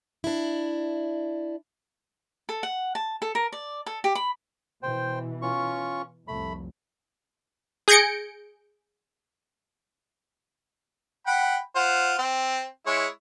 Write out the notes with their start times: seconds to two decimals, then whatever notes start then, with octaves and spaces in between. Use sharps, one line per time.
0.24 D4 E4
2.49 A4
2.63 F#5
2.95 A5
3.22 A4
3.35 A#4
3.52 D5
3.86 A4
4.04 G4
4.15 B5
4.83 B2 E3 C5 G5
5.42 C#4 F4 C#6
6.28 F1 C2 C3 A3 B5
7.88 G#4 G6 G#6 A#6 C#7 D7
11.27 F#5 G5 B5
11.76 F4 C5 F#5
12.18 C4
12.87 G#3 E4 C#5